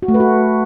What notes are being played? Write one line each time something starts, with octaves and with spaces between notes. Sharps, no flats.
F#4
A3
B4
F#4